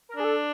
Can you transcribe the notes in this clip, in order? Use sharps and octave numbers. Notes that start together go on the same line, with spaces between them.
A#4
D4 G#4
A4